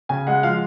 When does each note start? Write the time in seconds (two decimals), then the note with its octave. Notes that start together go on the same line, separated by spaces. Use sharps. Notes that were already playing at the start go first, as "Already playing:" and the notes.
0.09 C#3 G#5
0.27 G#3 F#5
0.43 F3 F5